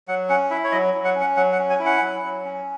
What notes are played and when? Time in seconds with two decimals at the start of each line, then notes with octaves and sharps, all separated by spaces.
0.08 F#3 F#5
0.29 C#4 F#5
0.51 E4 E5
0.64 C#5
0.72 F#3 D#5
0.94 F#3
1.05 F#5
1.15 C#4
1.21 F#5
1.37 F#3 F#5
1.53 F#5
1.59 C#4
1.70 G#5
1.80 E4
1.86 F#5
2.02 F#3
2.23 F#3
2.45 C#4